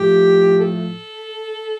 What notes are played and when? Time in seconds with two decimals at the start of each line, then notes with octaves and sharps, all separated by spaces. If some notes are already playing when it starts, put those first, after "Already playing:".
Already playing: A2 F3 G4
0.59 A4